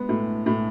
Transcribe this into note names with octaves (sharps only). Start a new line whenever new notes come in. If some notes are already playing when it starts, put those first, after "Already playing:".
Already playing: G#3 B3
A2
A2